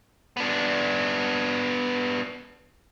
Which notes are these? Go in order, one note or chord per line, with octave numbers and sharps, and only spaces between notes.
B3 D4